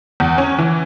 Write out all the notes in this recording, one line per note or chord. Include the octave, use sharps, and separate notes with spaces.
E2
C#4
E3